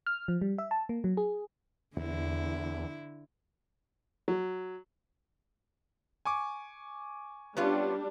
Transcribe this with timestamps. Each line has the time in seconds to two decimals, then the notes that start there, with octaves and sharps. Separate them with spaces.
0.07 F6
0.28 F3
0.42 G3
0.58 E5
0.71 A5
0.89 A#3
1.04 F#3
1.17 G#4
1.97 E2 D3 E4
4.28 F#3
6.25 G#5 C#6 D6
7.57 G3 B3 C#4 D4 F4